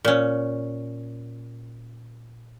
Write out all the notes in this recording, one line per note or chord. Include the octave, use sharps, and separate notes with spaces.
A#2 C#4